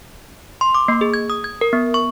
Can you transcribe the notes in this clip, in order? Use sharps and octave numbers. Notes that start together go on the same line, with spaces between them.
C6
D6
A#3
G#4
G#6
D#6
G#6
A#4
B3
C#6